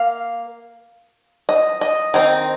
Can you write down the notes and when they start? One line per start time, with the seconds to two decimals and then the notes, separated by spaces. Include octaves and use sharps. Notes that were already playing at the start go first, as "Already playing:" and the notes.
Already playing: A#3 F5
1.49 D#5
1.81 D#5
2.14 D#3 C4 D#4